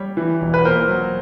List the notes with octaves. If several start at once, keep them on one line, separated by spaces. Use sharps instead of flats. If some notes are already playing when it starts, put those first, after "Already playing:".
Already playing: G3 C#5
E3
E1
B4
A#2 A#4 C5
F#3